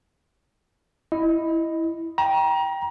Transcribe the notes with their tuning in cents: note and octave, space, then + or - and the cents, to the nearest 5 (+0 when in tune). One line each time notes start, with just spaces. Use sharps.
E4 +0 D#5 +0
G5 +0 A#5 +30